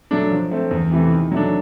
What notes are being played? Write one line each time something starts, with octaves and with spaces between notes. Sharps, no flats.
F#3 A3 D4
F3
A3 C4
E2
C3 E3 A3
D#3
F#3 A3 D4